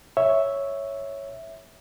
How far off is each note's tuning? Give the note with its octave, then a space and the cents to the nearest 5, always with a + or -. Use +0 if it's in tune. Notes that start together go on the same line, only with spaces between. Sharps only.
C#5 +0 E5 -5